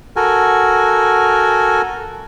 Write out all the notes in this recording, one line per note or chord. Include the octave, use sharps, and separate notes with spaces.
F#4 A4 A#4 G#5